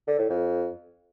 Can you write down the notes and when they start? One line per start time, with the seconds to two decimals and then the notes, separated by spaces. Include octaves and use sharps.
0.07 D3
0.19 A2
0.30 F2